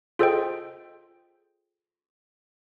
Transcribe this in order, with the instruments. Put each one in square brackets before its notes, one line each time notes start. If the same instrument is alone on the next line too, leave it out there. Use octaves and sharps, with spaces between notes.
[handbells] F4 G#4 A4 C5 D#5 G5